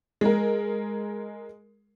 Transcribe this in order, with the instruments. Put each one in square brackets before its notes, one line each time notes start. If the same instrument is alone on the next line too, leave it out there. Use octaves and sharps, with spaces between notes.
[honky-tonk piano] G#3 A#4